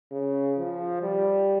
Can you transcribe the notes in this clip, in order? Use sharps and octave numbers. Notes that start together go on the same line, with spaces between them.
C#3
F3
G3